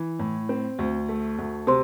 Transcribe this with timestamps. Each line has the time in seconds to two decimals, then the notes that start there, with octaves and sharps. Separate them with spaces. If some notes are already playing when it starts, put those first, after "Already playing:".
Already playing: E3
0.19 A2
0.49 C4
0.79 D2
1.09 A3
1.39 D2
1.67 C3 C5 C6